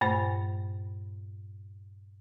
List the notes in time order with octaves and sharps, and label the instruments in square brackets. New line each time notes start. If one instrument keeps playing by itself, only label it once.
[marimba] G2 A#2 A3 C5